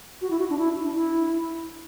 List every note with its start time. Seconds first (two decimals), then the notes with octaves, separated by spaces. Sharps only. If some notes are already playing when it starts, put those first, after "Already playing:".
0.22 F#4
0.30 E4
0.39 F#4
0.50 D4
0.58 E4
0.84 D4
0.95 E4